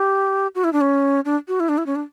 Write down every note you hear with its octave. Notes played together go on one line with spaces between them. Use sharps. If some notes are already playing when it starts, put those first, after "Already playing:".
Already playing: G4
F#4
E4
D4
C#4
D4
F#4
E4
D4
E4
C#4
D4